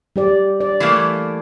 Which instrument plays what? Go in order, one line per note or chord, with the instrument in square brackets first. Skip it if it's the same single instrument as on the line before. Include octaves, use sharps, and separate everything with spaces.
[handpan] G3 G4 D5
D5
[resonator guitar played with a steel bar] E3 A3 A#3